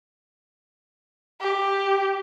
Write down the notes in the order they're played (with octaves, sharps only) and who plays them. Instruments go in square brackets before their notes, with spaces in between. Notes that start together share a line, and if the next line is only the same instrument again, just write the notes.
[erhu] G4